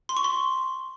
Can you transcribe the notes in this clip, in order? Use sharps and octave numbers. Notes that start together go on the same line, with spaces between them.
C6
C#6
C6